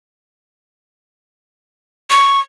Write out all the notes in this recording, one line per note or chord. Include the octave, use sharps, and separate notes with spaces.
C#6